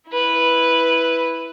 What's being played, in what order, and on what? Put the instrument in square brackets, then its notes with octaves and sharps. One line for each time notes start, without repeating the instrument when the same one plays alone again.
[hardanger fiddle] E4 B4